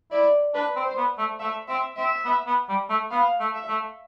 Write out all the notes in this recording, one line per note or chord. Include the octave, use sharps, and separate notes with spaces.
E4 D5
D4 B4
C4
C5
B3
A3
A3 E5
C4 E5
C4 E5
B3
B3
G3
A3
B3 F5
A3
E5
A3